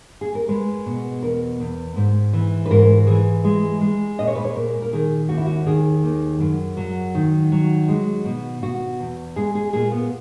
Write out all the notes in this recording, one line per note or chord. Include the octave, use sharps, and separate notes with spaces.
G#4
A#4
G#3 B4
B2
E2 A#4
E2
G#2
E3
B4
G#2 A#4
E3 G#4
G#3
G#3
A#2 D#5
C#5
B4
C#5
A#2 A#4
A#4
D#3 G#4
D#2 F#4
E4
F#4
D#3 G#4
D#2
F#2
F#3
D#3
F#3
G#3
B2
B2 F#4
E2
G#3 G#4
G#4
A#2 G#4
B3